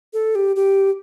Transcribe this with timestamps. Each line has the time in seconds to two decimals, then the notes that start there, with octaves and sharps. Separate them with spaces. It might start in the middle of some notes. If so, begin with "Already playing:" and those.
0.13 A4
0.35 G4
0.56 G4